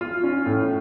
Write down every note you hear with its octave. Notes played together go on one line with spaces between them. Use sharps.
F4
C#4
A2